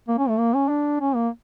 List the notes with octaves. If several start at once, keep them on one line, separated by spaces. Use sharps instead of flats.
A#3
C#4
A3
A#3
C#4
D4
C#4
A#3